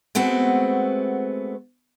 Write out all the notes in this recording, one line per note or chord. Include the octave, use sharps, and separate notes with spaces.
G#3 A3 B3 C4 F#4